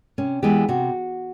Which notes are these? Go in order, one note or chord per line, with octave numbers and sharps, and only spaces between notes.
C3 C#4
E3 G#3 B3 G4
C3 F#4